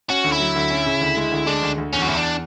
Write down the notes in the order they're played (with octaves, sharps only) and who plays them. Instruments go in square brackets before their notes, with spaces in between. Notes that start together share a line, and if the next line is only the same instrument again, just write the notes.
[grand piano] C#4 [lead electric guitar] F#4
[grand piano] D2
[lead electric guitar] E4
[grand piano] F#3
D2
C#4
C#3
D2
G#3
D2
[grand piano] G#3 [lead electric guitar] D4
[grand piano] D2
D2
[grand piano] E2 [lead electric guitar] C#4
[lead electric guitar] F#4
[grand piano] E2 [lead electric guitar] E4
[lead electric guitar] D4